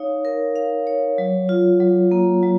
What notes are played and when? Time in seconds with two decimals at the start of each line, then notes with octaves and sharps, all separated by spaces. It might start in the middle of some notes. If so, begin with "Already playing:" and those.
Already playing: D#4 C#5 F5
0.25 A#4
0.56 F5
0.87 C#5
1.18 F#3
1.49 F4
1.80 F#3
2.11 A#3
2.43 F#3